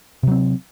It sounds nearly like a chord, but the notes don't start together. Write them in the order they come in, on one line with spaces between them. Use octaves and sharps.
C3 F#3 C4